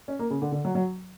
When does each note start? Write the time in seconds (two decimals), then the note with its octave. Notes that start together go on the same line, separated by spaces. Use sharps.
0.08 C#4
0.19 A#3
0.30 C#3
0.42 D3
0.52 D3
0.65 F#3
0.75 F#3